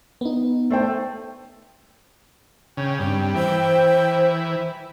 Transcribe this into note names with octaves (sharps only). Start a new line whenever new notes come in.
B3 D#4
A3 C5 G5
C#3 G5
G2 C4
E3 C5